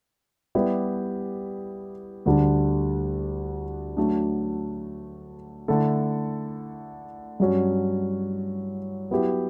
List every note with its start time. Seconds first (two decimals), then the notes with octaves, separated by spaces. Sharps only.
0.55 G3 B3 E4 G4 D5
2.26 D2 D3 G3 D4
3.97 F#3 A3 D4
5.68 D3 A3 E4 A4
7.40 G2 F#3 C#4
9.11 F#3 B3 E4 G4